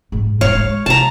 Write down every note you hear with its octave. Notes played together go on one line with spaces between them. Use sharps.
G#2
G#2 G3 C#5 F5
G#3
C3 A5 A#5